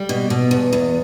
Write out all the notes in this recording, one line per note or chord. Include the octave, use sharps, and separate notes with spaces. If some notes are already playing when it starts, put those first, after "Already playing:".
Already playing: G3
B2
B2
E2
E2